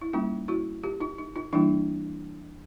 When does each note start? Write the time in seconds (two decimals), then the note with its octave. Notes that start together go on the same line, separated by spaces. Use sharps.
0.01 E4
0.13 G3 A#3 C#4 D#4 F4
0.48 E4 F#4
0.83 F4 G4
1.00 D#4 F4
1.19 D#4
1.36 D#4 F4
1.53 E3 G3 A#3 D4 E4